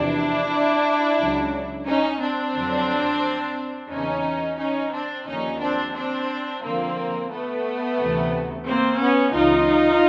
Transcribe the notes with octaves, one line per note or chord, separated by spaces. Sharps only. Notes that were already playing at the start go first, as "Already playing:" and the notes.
Already playing: E2 C3 F3 D4 E4
C#2 C#3 F#3
C#4 D#4
C4 D4
F2 D3 F#3
E2 C#3 E3 C#4 D#4
C#4 D#4
C4 D4
D#2 D3 F3 C#4 D#4
C4 D4
C4 D4
F2 D3 F3 A#3 C4
A3 B3
D2 C3 E3
A#3 C4
B3 C#4
C#2 C#3 E3 D#4 F4